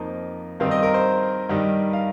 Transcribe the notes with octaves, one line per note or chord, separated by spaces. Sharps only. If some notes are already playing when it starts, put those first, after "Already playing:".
Already playing: F2 F3 A#3 D#4
G2 D#3 C4 D#4 F5
D#5
A#4
C5
G2 D#3 G3 D#4
F5